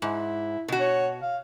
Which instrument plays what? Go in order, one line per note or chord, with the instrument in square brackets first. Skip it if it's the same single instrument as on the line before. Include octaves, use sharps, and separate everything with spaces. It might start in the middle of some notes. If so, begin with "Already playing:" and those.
[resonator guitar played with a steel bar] G#2 [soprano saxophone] E4
[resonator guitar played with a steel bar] B2 F#4
[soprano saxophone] C#5
F5